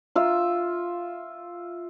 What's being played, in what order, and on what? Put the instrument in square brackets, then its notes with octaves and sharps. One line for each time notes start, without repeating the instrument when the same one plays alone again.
[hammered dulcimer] F4 E5